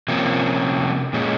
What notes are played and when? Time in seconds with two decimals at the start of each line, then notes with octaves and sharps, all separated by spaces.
0.08 C3 F3 A#3 C#4
1.13 A#2 G#3 C#4